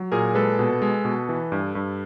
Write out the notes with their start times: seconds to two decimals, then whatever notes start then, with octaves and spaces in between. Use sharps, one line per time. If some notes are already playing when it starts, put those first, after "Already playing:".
Already playing: F#3
0.12 A#2 G#4 A#4
0.35 G#3 A4 B4
0.59 B2
0.82 G#3
1.05 B2
1.29 E3
1.52 G2
1.75 G2